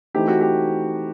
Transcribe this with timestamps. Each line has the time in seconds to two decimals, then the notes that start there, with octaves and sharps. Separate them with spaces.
0.14 E3 A3 C4 D#4 G4
0.28 F#4
0.41 G4